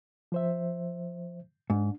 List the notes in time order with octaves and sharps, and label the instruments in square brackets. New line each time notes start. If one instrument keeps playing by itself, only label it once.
[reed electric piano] F3 C5 E5
[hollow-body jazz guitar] G#2 [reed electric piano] D4